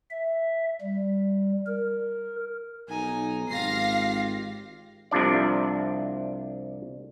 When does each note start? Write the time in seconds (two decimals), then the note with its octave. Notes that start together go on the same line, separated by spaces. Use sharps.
0.11 E5
0.81 G3
1.67 A#4
2.89 B1 D#4 G#5
3.49 G#1 F4 G4 F5 A#6 C7
5.11 C2 C3 F3 D4 D5